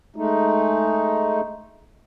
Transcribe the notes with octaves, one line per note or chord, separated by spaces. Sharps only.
G#3 A3 D#4